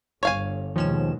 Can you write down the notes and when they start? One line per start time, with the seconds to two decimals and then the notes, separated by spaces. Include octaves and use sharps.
0.23 G1 C#5 F5 G#5
0.76 D#2 G#2 B2 F3 C#4 E7